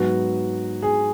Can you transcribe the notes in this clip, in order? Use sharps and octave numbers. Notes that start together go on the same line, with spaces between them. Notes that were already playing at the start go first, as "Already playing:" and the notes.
Already playing: G#2 F#3 B3 F#4
G#4